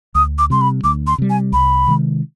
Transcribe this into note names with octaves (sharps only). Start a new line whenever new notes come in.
D2 D#6
D6
C3 G3 C6
B5
D2 D6
C6
C3 G3
G#5
C2 B5
C3 D#3 G#3